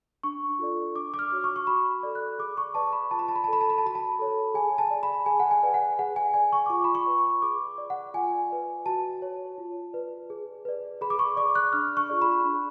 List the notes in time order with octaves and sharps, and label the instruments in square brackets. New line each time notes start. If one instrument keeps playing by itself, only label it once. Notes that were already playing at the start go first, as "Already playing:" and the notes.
[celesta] D4 C#6
F4 A4 D5
D4 D6
D6
F6
F#4 C#5
C#6
C#6
F#4 B5
A4 D5
F#6
G#4 D6
C#6
B4 D5 A5
B5
F4 A5
B5
A5
B5
A4 D5 A5
B5
A5
B5
A5
F#4 B5
A5
A4 C#5
G#4 G#5
A5
D5
B5
G#4 G#5
F#5
G#5
B4 D5
F#5
G#4 F#5
G#5
D5 G#5
C#6
D6
F4 C#6
B5
C#6
B4 D5
C#6
G#4 D6
D5
F#5
F4 G#5
B4 D5
F#4 A5
C#5
F4
B4 D5
G#4
B4 D5
G#4 B5
D6
C#6
D5 D6
F#6
D4 F6
C#6
F4 G#4 D5
B5
D4